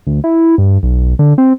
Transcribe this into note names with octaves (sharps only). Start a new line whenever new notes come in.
D2
E4
G2
B1
D3
C4